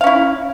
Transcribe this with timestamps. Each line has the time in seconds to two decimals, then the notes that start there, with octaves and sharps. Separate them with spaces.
0.01 F5
0.04 C#4
0.07 E4